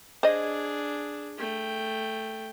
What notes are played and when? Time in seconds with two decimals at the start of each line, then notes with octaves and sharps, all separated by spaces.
0.23 D4 G#4 C5 D#5
1.38 A3 G5